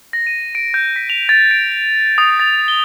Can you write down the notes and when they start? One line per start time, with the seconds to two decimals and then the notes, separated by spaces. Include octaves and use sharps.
0.13 A#6
0.27 D#7
0.55 D7
0.74 G6
0.96 B6
1.10 F7
1.29 A6
1.51 D7
2.18 D#6
2.39 A6
2.68 G7